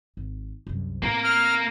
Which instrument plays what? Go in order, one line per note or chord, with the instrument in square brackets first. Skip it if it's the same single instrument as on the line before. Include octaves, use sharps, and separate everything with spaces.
[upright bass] G#1
C2 F#2
[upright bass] A2 C4 [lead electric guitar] A#3 A#4
[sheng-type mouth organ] F6